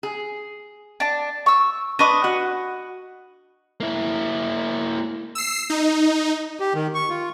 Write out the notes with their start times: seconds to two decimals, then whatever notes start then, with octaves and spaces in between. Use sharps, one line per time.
0.03 G#4
1.00 D4 A5
1.46 C#6 E6
1.99 D4 B4 D#5 C#6 D#6
2.24 F#4 F#5
3.80 A#3 E4
5.35 E6 C7
5.70 D#4
6.60 G4
6.75 D#3
6.95 C#6
7.10 F4